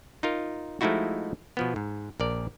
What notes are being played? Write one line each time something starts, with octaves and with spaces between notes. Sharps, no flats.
D#4 F4 A#4
F3 G#3 A3 D#4 E4 F#4
B2 F3 B3
G#2
A#1 A#4 D5